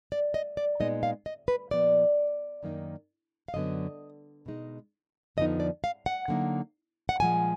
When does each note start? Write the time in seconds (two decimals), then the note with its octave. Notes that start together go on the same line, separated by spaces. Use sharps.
0.12 D5
0.34 D#5
0.57 D5
0.80 A#2 G#3 B3 D#4 D#5
1.03 F5
1.26 D#5
1.48 B4
1.71 A#2 F3 B3 D5
2.63 F#2 D#3 A#3 D#4
3.48 F5
3.54 F#2 D3 F#3 B3 D#5
4.46 B2 G#3 D#4
5.37 F2 D3 F3 B3 D#4 D#5
5.60 D5
5.84 F5
6.06 F#5
6.28 D3 F#3 A#3 D#4
7.09 F#5
7.20 A#2 F3 G#3 G#5